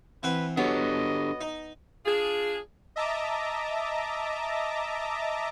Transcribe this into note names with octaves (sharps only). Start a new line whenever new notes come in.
E3 C4 B4 F#5
F#3 B3 D4 G4 A4 D#5
D#4
D4 F4 G#4
D#5 E5 A5 A#5 D6